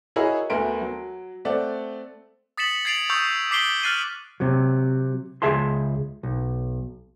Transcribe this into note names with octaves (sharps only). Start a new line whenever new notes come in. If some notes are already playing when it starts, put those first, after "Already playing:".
E4 F#4 G#4 A#4 C#5 D#5
D2 A3 B3 A#4 C6 D7
F#3
A3 C4 D5 F#5
D#6 A6 B6 C#7 E7 F#7
G#6 A6 C7 D7 F7 F#7
C#6 D#6 E6 G6 F7
D6 B6 C7 D7 G7
F6 F#6 A6 C7 D#7 F#7
C3 F#3
C#2 F3 G#4 E5 A5 C6
B1